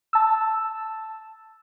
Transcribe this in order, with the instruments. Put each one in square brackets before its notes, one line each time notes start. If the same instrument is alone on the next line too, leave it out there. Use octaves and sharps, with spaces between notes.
[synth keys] A5 E6